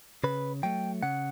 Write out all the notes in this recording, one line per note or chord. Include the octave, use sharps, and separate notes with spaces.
C#3 B4
F#3 A3 G5
C#3 F#5